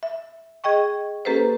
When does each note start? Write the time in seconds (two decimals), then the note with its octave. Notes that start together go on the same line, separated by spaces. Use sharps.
0.03 E5
0.64 G#4 D#5 G5 C#6
1.25 A#3 C#4 G4 A4 B4 C5